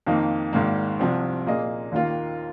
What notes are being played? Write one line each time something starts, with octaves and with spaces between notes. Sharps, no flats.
F2 D#3 A#3 D#4
G#1 G#2 D#3 A#3
C2 C3 F3 C4
A#2 A#3 G#4 D#5
D#2 D#3 A#3 F4 A#4